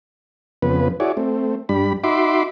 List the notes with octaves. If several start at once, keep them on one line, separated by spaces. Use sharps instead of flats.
F2 C#3 B3 B4
E4 F#4 G#4 C#5 D5
A3 C4
G2 G3 D4 B5
D#4 F#4 E5 B5 C6 D6